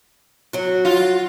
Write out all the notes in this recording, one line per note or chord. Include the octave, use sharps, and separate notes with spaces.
F#3 F#4
F4